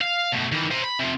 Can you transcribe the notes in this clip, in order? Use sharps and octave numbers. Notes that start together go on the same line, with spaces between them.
F5
B2 A3
D#3 E3
C5 A#5
B5
C3 F3